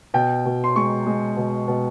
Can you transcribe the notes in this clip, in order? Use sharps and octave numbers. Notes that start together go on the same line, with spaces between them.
B2 G5
B2
C6
G#3 C#6
G#3
B2
B2